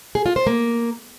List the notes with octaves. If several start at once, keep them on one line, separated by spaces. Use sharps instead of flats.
G#4
F4
C5
A#3